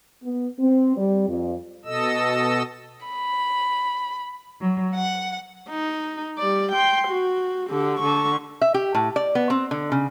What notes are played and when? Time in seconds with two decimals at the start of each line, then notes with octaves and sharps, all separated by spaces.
0.23 B3
0.59 C4
0.96 G3
1.27 F2
1.85 B2 A4 D#5 E6
3.06 B5
4.61 F#3
4.95 F#5
5.69 D#4
6.38 G3 D5
6.72 G5 C6
7.08 F#4
7.68 D3 G4
8.00 D3 C#6
8.61 E5
8.74 G4
8.95 A2
9.16 D5
9.35 B3
9.50 C4
9.71 D3
9.92 C#3